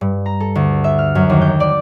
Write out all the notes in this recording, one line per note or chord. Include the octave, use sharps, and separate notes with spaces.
G2
A#5
A4
D2
E5
F6
F#2
D#2
G6
D5